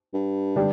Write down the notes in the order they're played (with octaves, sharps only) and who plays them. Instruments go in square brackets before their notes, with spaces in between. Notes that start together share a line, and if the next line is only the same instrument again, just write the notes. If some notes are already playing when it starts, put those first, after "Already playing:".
[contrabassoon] G2
[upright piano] D3 G3 D4 G4